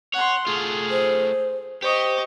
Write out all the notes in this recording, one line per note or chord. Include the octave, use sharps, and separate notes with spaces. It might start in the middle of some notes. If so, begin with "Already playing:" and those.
C#5 F#5 C6
A3 F4 G#4
C5
G4 C5 D#5 C#6